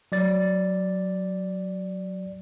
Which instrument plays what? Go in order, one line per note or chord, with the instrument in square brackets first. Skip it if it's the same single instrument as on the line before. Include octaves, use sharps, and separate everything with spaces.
[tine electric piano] F#3 D5 A6